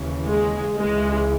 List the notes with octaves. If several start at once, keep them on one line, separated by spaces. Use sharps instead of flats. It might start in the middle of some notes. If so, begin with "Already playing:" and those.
Already playing: D#2 C#3 E3
G#3
C#2 C#3 E3 G#3